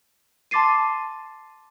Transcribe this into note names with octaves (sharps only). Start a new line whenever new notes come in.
A5 C6 D6 A6 C7 D#7